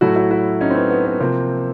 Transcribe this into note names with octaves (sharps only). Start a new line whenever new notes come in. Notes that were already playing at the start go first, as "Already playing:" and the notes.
A2 F#3 A3 E4 F#4
E4 F#4
E4 F#4
C#4 D#4
C4
B3 C#4
B3
B3
C3 F3 A#3 C4